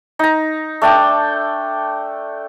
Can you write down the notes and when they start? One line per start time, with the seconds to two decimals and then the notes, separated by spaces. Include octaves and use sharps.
0.19 D#4 A#5
0.81 A3 D4 D5 G5